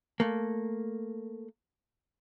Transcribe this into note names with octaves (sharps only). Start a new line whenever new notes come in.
A3 A#3